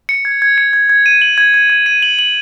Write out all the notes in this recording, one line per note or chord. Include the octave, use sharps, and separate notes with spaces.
C#7
G#6
G#6
C#7
G#6
G#6
D#7
F#7
G#6
G#6
G#6
D#7
F#7
F#7